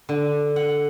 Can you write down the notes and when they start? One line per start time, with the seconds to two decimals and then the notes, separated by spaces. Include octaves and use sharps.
0.09 D3
0.56 F#5